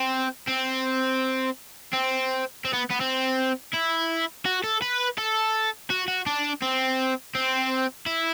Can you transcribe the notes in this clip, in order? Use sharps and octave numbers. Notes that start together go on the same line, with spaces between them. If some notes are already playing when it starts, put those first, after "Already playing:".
Already playing: C4
C4
C4
C4
B3
B3
C4
E4
F#4
A4
B4
A4
F#4
F#4
D4
C4
C4
E4